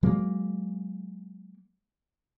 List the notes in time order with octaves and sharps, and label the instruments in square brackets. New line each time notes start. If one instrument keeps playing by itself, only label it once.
[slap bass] F#3 G#3 A#3